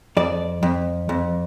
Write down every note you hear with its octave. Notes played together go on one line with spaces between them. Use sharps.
F2 D5
F2
F2